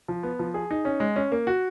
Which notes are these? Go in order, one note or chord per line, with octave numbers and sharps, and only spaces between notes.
F3
B3
F3
G#4
D#4
C#4
G#3
C#4
A#3
F#4